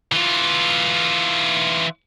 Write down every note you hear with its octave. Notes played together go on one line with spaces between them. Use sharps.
E3 F4